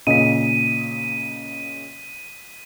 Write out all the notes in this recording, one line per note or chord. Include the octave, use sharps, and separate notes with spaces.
A#2 C#3 D#5 B6 D#7